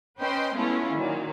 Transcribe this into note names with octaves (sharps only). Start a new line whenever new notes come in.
C#4 B4 C5 D#5 G5 C6
G#3 A3 B3 C#4 E4 F4
A#2 D#3 F#3